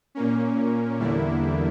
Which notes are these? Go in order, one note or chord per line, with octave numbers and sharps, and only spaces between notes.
A#2 A#3 C#4
E2 D3 G3 A#3 E4